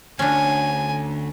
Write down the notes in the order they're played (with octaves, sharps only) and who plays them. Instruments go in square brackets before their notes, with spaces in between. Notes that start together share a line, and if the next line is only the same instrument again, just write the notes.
[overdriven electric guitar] D2 [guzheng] C#4 D4 [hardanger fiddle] G#5